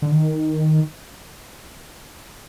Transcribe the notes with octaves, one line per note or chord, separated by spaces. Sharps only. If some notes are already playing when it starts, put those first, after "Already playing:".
D3
D#3